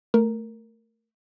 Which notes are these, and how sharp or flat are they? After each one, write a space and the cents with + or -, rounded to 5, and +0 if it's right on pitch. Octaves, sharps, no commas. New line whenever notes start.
A3 +10 A#4 +0